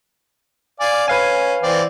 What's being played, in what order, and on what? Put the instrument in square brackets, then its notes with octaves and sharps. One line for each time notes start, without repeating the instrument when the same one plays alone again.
[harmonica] D5 F5 G#5
[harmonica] C#4 [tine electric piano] B4 F5 G#5
[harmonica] E3 C4 D5